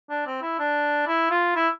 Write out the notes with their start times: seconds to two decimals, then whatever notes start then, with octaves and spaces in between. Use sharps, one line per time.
0.10 D4
0.27 C4
0.42 E4
0.59 D4
1.07 E4
1.31 F4
1.56 E4